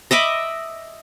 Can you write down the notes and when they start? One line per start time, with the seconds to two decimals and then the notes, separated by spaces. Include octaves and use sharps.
0.11 D#5 E5 B5 D6